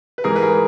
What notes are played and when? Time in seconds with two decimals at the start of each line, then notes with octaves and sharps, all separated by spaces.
0.18 B4
0.24 G#2 E3 G#4 A#4
0.36 B4
0.42 G#4 A#4